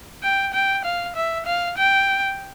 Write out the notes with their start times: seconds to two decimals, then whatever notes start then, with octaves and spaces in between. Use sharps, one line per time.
0.23 G5
0.54 G5
0.85 F5
1.16 E5
1.47 F5
1.78 G5